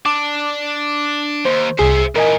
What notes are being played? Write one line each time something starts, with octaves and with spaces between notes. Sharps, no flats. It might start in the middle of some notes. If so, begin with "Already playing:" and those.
D4 D6
D#2 C5
C2 G#4 C5 E5
A#2 E3 A#4 D#5 G#5